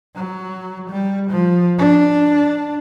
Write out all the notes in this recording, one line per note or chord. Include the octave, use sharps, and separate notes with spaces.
F#3
G3
F3
D4